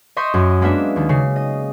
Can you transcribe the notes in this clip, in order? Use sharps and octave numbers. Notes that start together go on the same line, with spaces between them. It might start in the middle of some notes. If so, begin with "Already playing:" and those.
D#5 E5 C6 C#6 D#6 G6
F#2
G#3 A#3 B3 D4 E5
D#2 D#3
C#3 C7
D#5